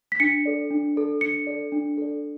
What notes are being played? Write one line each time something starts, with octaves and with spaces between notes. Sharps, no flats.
B6
D4 C#7
A4 D5
D4
A4 D5
D4 C#7
A4 D5
D4
A4 D5